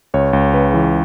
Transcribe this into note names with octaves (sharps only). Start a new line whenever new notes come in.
C#2 C#5
C#2
C#3 B4
E3